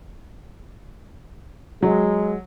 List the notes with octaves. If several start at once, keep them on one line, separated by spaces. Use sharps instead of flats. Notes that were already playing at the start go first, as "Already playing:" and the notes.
F#3 G#3